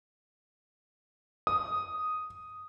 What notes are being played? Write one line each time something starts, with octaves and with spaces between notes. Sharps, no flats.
D#6